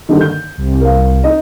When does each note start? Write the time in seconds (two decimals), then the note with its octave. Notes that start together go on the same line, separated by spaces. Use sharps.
0.09 G2 D3 D#3
0.21 G6
0.58 C2
0.81 A#4 F5
1.24 D#4 D#5